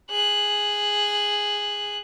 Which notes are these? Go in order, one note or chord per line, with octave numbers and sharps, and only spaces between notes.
G#4 F#6